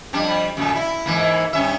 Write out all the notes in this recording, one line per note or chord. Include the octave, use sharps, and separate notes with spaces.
F2 G3 D4
F#2 A#2 A3
E4
G#2 E3 A#3
G2 C#4 E5